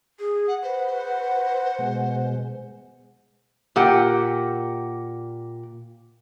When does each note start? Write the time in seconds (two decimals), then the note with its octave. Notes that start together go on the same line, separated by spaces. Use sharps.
0.19 G#4
0.48 F#5
0.63 B4 C5 F#5
1.78 B2 G#3
3.76 A#2 G4 F#5